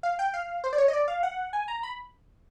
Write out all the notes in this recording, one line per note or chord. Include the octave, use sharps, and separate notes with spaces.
F5
G5
F5
C5
D5
C#5
D#5
D5
F5
F#5
G#5
A#5
B5